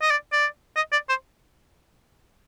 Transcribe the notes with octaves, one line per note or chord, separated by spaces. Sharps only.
D#5
D5
D5
D#5
D5
C5